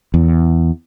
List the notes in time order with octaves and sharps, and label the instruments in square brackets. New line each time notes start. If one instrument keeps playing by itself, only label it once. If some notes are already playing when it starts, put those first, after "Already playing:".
[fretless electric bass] E2